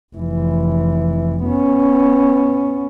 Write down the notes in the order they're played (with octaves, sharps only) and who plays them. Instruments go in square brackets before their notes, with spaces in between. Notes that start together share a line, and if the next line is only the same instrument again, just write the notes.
[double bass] F1 E3
B3 C#4